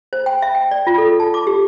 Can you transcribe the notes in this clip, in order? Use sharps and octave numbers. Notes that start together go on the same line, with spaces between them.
C5
G5
E5
G5
D5
F4
A4
A5
D6
G4